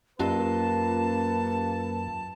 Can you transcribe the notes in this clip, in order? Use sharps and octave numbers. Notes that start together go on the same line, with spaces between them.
F#2 A#3 C#4 F4 G4 B4 A5